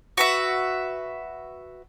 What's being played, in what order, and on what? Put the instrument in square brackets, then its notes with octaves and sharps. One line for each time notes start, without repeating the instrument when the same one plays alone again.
[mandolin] F#4 B4 E5